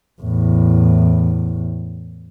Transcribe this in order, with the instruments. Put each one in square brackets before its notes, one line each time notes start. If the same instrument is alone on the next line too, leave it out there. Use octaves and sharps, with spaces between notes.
[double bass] E2 A2